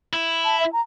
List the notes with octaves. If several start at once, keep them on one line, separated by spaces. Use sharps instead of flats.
E4
A5
E5
A#5